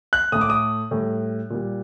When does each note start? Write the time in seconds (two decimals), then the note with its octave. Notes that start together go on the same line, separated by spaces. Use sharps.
0.13 F#6
0.32 A2 A3 D#6
0.41 D6
0.50 D#6
0.91 A2 G3
1.50 A#2 G3